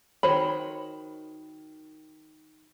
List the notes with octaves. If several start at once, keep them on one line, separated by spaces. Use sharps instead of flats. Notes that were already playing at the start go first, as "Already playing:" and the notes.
D#3 F#4 C5 C#5 B5